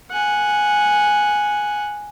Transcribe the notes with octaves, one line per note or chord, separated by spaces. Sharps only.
F#5 G#5